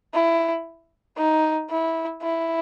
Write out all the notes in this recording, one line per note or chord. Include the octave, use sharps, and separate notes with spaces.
E4
D#4
E4
E4